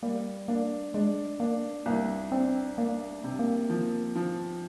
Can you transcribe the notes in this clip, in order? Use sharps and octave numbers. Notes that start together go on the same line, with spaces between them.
G3 A#3
A#3 D4
G#3 D4
A#3 D4
C2 A#3
C4 D4
A#3 D4
C3
A#3
F3
F3